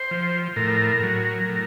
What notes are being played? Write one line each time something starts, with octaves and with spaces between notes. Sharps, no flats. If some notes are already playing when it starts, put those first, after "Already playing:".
Already playing: C5
F3
A2 A#4
F#3
A2